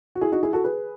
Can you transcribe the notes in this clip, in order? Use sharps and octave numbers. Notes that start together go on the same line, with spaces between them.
F#4
E4 G#4
D#4 F#4
E4 G#4
F#4 A4
G#4 B4